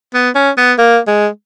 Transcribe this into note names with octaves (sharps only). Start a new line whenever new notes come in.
B3
C#4
B3
A#3
G#3